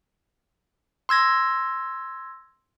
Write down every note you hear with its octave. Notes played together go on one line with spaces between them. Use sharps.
C6 E6 G#6 A#6